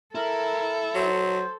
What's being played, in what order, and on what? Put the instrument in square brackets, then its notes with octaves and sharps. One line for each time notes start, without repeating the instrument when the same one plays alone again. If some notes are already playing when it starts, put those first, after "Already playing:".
[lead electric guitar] E4 [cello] A4 [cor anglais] A#4
[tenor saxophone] F#3 [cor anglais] C5